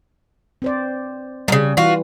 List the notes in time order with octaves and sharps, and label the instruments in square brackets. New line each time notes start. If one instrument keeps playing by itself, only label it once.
[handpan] C4 C5 D5
[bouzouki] A#2 C#3 [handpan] G3
[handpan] E3 [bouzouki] F4 F#4